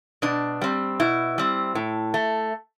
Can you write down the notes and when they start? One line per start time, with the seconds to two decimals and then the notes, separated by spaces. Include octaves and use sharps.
0.22 B2 D4
0.61 G3 C4
1.00 B2 E4
1.38 G3 C4
1.75 A2
2.14 A3